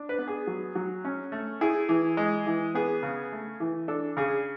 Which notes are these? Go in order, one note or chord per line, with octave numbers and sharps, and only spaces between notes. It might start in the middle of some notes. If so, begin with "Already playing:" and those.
Already playing: D4
B4
B3
G#4
F#3
F#3
C#4
A3
E4 G#4
E3
G#3
E3
B3 G#4
C#3
A3
E3
D4 A4
C#3 G#4